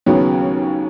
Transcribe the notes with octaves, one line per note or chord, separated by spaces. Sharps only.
D#2 C#3 F#3 B3